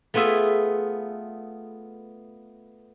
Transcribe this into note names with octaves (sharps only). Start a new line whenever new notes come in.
A3 B3 F4 G#4 E5 G#5